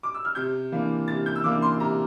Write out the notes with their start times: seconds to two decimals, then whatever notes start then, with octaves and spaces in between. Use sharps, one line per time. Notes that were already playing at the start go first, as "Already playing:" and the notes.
0.03 D6
0.14 E6
0.25 F6
0.35 C3 G6
0.72 E3 A#3 D4
1.08 C3 A6
1.26 G6
1.36 E6
1.44 E3 A#3 D4 D6
1.62 C6
1.80 C3 A#5